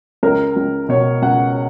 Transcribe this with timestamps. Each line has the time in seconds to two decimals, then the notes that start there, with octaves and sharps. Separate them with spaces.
0.23 C#2 A#4
0.56 C#2
0.89 B2 C#5
1.22 C#2 F#5